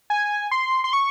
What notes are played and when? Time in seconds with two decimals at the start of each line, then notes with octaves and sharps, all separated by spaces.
0.10 G#5
0.51 C6
0.84 C6
0.93 C#6